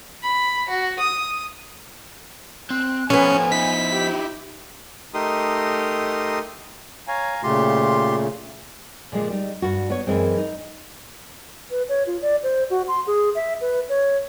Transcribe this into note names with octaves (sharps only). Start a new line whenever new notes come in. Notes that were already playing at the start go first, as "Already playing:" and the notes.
B5
F#4
D#6
C4 F#6
F3 B3 C#4 A4 B4 G#5
D#4 E4 B6
G4
A3 D#4 G4 A#4 C6 D#6
C#5 F5 G#5 A#5
A#2 C#3 A3 F4 G4 C6
A#2 D3 F3 G#3
G3 D#4
G2 F#4
B3 C#5
F#2 E3 G#3 C4
D#4
B4
C#5
F4
D5
C5
F#4
C6
G#4
E5
B4
C#5